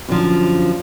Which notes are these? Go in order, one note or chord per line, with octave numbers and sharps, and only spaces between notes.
F#2 D3 F3